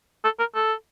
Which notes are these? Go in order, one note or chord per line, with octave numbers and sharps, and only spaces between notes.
A4
A#4
A4